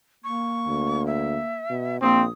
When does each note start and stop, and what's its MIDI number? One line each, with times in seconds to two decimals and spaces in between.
0.24 1.67 58
0.24 1.05 85
0.67 1.38 38
1.07 1.97 76
1.70 2.01 47
2.02 2.29 34
2.02 2.26 58
2.02 2.22 60
2.02 2.31 87